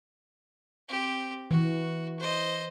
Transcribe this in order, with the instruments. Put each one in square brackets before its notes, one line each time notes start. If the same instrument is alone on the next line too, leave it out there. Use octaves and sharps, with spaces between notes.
[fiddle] C4 G4
[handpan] E3 [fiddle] F#4
[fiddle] C5 D#5